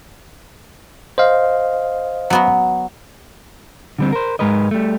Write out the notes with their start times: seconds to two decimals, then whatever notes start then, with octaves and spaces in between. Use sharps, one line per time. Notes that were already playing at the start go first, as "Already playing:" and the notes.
1.18 C5 D#5 F5
2.30 F#3 B3 F#4
3.99 D3 G3 C4
4.13 A#4 C5
4.39 G#2 C#3 G#3 A#4 B4 D#5
4.71 G3 A3